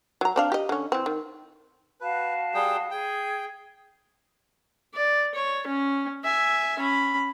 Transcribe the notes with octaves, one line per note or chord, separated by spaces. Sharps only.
F#3 A#5
C4 D4 F5
G4 D#5
D3 C#4
E3 C4
D#3
F#4 B4 F5 A5
G3 G#4 G5
G#4 G5
D5
C#5
C#4
E5 G#5
C#4 B5